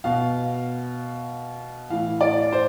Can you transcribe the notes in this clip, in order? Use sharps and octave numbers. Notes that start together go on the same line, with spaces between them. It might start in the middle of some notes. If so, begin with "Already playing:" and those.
B2 F5
A2 E3 F5
D5
C5